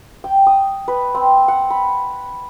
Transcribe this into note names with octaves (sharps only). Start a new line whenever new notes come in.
G5
D#6
B4
C4
F#5
B5